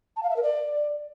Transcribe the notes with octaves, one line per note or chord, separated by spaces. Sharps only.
A5
F5
E5
A#4
D5